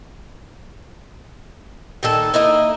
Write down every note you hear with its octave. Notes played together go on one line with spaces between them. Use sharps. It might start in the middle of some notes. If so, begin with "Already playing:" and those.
A#2 D#3 A4
A#3 D#4 E4 D#5